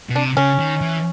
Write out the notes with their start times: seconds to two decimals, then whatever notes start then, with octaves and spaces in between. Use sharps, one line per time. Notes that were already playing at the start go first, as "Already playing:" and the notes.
0.10 B2
0.16 C3 D4
0.37 C#3 C#4
0.59 D#3
0.81 E3